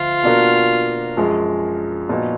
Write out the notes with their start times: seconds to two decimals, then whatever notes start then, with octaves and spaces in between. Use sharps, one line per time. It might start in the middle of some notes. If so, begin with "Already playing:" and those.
Already playing: D2 F3 F4
0.23 B2 A#3 D4 F#4 A#4
1.17 F#2 F3 G#3
2.09 A#2 F3 B3 D#4 F#4